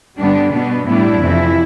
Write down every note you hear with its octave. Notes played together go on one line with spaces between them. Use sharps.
G2 D3 G3 B3 D4
B2 B3 D4
A2 G3 B3 D4 E4
F2 C3 E3